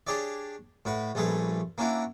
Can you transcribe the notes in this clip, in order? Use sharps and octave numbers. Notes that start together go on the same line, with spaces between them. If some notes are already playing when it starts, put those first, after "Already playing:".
D4 G4 G#4 C#5 D5
A2 F#4 B4
A#1 G3 A3 C#4 G#4 B4
A#3 C#4 D4 E4 F#4